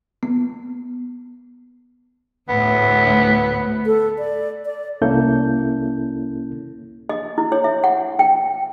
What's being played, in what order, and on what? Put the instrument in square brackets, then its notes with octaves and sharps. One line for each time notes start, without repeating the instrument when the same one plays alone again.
[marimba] B3
[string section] D2 A2 [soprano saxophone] B3
[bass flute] A4
D5
D5
[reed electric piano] C2 A#3 C#4 E4 A4 G6
[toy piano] D#5
E4
C#5
E5
F#5
G5